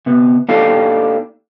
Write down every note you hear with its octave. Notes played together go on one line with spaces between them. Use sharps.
C3 B3
A#3 D4 D#4 G4 A4 F5